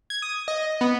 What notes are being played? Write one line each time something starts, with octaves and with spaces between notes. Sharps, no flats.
G#6
D#6
D#5
B3